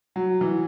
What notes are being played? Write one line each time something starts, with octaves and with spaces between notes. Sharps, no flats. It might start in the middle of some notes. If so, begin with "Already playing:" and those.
F#3
E3